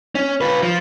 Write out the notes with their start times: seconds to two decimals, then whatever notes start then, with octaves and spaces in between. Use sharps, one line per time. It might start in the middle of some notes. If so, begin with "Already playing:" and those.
0.15 C#4
0.41 F4 B4
0.63 F3